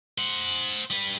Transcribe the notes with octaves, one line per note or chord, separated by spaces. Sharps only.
C5 F#5
G3 B4